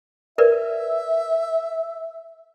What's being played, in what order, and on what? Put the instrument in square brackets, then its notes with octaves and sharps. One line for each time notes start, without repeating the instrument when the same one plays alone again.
[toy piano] A#4 B4 D5 [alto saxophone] E5